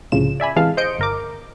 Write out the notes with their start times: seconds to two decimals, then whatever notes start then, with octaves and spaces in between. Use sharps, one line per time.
0.12 C2 A2 C#3 F3 E7
0.40 D5 E5 G#5 B5
0.56 C3 E3 G#3 F5 A5
0.77 C5 D#5 G6 C#7 D7
0.99 G1 A#4 D6